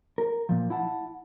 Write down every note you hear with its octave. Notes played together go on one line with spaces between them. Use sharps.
A#4
A#2 F3
E4 F#5 A5